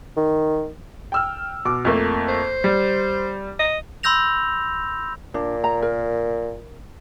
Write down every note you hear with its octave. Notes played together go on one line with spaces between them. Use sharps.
D#3
G5 E6 F6
B2 D6
F2 A3 A#3
C5
G3
D#5
B5 C6 E6 G6 A#6 F7
A#2 D4
A#5
A#4